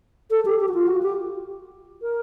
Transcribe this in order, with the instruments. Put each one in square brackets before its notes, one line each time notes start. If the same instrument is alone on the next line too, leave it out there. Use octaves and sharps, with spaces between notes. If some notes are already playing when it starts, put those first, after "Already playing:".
[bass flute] A4
G4
G4
F#4
F4
F#4
G4
A#4